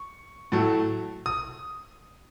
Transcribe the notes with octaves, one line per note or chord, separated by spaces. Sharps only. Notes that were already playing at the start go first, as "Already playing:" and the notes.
Already playing: C#6
A2 F#3 A3
D#6